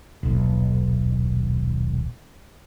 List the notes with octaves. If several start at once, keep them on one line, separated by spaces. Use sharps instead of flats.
D#1 B1